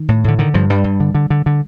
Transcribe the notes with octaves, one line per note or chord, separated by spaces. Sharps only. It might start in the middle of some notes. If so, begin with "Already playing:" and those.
Already playing: D#3
A2
A2 D3
D3 D#3
G2 F3
G2 G3
G2
D3
D3
D3
D3